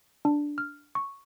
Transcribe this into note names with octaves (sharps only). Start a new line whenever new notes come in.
D4
F6
C#6